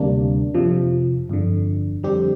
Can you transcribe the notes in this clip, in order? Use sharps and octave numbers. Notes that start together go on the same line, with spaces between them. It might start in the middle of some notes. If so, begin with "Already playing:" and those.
Already playing: D2 C3 G3 A#3 D4
F2 C3 F3
G1 F2 D3
F2 D3 G3 C4 G4